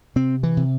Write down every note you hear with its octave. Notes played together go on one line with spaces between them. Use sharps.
C3 C4
E3
C3